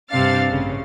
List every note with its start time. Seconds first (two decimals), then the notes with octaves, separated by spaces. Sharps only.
0.11 G2 C3 C4 D4 F5 A6
0.51 A1 C#3